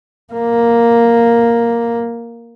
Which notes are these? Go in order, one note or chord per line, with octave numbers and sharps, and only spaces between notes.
A#3